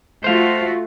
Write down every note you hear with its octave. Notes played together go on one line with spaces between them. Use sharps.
A3 F4 F#4 C5 F5